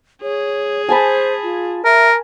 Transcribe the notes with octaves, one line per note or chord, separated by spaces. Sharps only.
G#4 C#5
C5 G#5 A5 B5
F4
A#4 E5